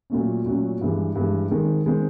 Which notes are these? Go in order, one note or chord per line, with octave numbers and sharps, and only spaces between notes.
A#2 F#3 A3 C#4
A#2 F#3 A3 C#4
G2 E3 G#3
G2 E3 G#3
D#3 G#3 C4
D#3 G#3 C4